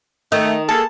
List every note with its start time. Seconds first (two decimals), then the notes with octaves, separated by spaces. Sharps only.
0.32 D#3 A3 D#5
0.69 A#3 G#4 A4 A5